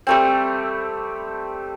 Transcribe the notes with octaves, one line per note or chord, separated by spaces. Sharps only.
G3 A3 C4